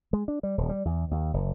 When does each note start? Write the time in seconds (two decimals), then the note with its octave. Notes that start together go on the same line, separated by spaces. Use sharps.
0.13 G#3
0.28 D4
0.43 G3
0.58 D#1
0.69 G3
0.85 E2
1.11 D#2
1.34 F#1